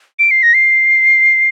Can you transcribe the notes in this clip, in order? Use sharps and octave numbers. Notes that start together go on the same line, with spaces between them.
D7
C7
A#6
C7